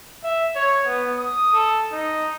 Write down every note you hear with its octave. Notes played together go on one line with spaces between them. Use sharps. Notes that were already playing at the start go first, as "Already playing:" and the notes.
E5
C#5
B3
D#6
A4
D#4